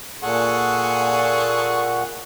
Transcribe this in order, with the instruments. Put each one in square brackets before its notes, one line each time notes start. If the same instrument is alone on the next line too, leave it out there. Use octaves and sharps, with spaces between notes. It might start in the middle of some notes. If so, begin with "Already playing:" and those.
[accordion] A#2 F#5 [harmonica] G#4 A4 C#6